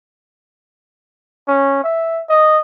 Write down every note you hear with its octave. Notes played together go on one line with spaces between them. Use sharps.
C#4
E5
D#5